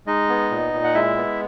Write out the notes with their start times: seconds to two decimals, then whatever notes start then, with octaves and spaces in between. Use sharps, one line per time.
0.07 G#3 D#4 D#5
0.29 B3
0.51 A#2
0.74 A#2
0.84 F#5
0.94 G#3 E4 E5
1.17 B3